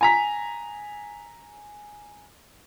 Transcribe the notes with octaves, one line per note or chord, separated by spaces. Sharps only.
G#5 A#5 B6